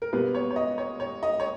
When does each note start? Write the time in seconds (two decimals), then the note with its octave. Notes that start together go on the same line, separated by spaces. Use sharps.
0.02 A#4
0.13 B2 G3 A#3 B4
0.35 C#5
0.51 C#5
0.56 D#5
0.78 C#5
1.00 C#5
1.23 D#5
1.40 C#5